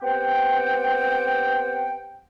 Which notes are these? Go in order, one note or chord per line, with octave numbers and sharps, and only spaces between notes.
B3 C4 G4 F#5 G5